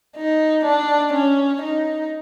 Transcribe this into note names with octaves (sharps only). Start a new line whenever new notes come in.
D#4
D4
C#4
D#4